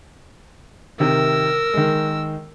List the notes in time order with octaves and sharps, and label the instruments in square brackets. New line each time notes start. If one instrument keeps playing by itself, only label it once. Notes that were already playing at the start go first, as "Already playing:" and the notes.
[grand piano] C3 D#3 [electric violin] A#4 E6
[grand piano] D#3 G#3